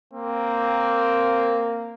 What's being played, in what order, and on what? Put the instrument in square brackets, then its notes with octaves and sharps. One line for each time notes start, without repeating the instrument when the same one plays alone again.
[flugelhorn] A#3 [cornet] C4